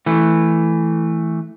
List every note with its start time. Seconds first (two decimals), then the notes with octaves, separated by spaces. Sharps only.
0.06 E3 A3